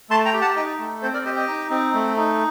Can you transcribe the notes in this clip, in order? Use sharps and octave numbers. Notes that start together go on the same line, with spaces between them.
A3 A5 C6
G5 A#5
G4
F#5 A5
D#4 D#5 G5
A3
C4 A4 C5
A#4 D5
G4 C5 D#5
D#5 G5
D#4
C4
A3
D#4